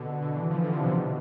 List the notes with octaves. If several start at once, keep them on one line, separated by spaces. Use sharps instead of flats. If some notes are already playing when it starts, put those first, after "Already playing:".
Already playing: B2 D3
D3
E3
F3
D3
C3
B2